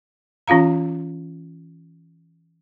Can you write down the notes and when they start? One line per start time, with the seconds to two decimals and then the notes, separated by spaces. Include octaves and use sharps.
0.48 E3 C#4 F4 F5 A#5